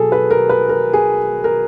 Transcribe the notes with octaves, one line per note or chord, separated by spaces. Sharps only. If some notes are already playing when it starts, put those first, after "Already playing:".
Already playing: B2 F#3 G#4 A4
B4
A#4
B4
A#4
G#4
A#4